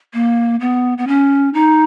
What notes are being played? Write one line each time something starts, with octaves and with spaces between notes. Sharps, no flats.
A#3
B3
B3
C#4
D#4